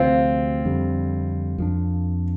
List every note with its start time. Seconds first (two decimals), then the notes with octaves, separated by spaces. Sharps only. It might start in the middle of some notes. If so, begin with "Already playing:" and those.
Already playing: D2 C3 F3 C4 F4
0.65 F2 D3 G3
1.58 F2 F3 D4